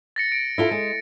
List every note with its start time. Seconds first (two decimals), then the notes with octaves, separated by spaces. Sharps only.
0.16 A6 A#6 C#7
0.32 D7
0.58 E4 F4 A4
0.71 G#3